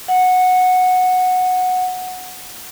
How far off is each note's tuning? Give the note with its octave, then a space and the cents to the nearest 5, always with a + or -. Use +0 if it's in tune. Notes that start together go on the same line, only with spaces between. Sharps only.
F#5 -10